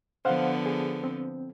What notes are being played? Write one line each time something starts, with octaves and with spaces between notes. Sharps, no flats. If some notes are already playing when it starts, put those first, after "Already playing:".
D3 F3 B3 C5 F5 F#5
G#4
C4